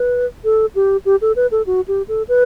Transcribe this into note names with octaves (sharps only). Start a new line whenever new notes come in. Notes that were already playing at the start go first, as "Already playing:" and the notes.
Already playing: B4
A4
G4
G4
A4
B4
A4
F#4
G4
A4
B4